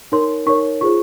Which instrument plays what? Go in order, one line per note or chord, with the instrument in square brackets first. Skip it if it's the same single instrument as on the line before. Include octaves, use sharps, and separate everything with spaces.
[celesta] D#4 A#4 C#5 C6
D#4 A#4 C#5 C#6
F4 G#4 C5 C#6